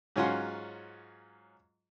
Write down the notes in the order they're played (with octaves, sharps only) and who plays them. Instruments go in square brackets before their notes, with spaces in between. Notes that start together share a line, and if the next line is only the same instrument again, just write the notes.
[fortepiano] G#2 F#3 C#4 F4 F#5 C6